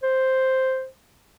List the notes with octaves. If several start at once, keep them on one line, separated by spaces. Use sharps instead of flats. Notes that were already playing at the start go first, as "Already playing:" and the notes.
C5